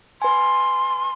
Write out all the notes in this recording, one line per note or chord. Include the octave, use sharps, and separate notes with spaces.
B4 G#5 C6